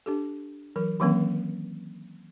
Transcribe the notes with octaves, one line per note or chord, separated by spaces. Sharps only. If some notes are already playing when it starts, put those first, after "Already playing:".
D4 G4 A4
E3 F#3 A#4
D#3 E3 F#3 A#3 C4 C#4